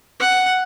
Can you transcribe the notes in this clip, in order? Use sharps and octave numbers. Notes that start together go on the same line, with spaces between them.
F#5